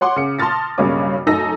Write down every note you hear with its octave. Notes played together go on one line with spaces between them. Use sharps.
C#5 F#5 C6 D6
C#3 C#7
A5 C6 D#6 F6 A6 A#6
B1 G2 C#3 A#3 C#5 D6
F#2 A3 D#4 A4 E6 A#6